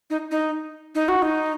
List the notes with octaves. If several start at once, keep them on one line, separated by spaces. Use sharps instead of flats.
D#4
D#4
D#4
F#4
D#4